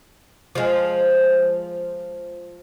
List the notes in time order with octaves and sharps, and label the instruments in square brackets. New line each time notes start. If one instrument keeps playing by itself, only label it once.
[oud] F3 G#3